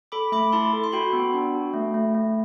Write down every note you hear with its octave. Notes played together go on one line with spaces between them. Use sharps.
A4 B5 D6
A3 B5 D6
E4 A5 C6
A4
C6
F#4 G5 B5
B3
D4
F#4
A3
A3
A3